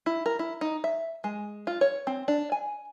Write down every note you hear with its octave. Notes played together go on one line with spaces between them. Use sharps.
E4
A#4
E4
D#4
E5
G#3
F4
C#5
C4
D4
G#5